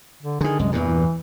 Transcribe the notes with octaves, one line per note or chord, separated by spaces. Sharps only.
D3
D3 D#3 G#4
C2 F#2 G#3
E2 G2 A#2 E3